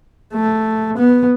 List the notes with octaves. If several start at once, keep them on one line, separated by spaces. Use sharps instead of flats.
A3
B3